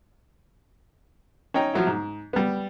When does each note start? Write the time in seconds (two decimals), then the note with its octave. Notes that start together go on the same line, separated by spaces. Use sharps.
1.54 C#4 D#4 G5 A#5
1.73 F3 F#3 E4
1.87 G#2
2.33 G3 B3